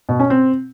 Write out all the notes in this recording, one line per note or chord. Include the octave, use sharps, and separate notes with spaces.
B2
C#4
C4